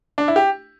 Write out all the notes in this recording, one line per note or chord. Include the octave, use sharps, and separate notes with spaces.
D4
E4
G4